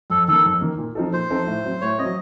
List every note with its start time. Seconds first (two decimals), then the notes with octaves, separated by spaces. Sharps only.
0.10 F2 A4
0.28 D#3 A#3 A4
0.45 F2
0.61 D#3 A#3
0.78 A#2
0.95 F3 C4 D#4 A4
1.13 A#2 C5
1.30 F3 C4 D#4 A4
1.47 A2
1.64 F#3 C4
1.82 A2 C#5
1.98 F#3 C4 D#5